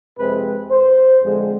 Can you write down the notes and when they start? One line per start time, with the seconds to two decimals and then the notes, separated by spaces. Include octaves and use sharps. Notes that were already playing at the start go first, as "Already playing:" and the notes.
0.18 F2 C3 G#3 C4 B4
0.71 C5
1.22 F2 D3 G#3 C4